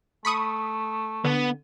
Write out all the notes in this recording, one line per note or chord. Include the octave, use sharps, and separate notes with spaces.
A3 B5 C#6 D#6
D3 B3